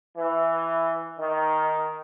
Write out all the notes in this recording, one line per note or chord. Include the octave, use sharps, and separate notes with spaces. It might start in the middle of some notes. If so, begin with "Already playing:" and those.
E3
D#3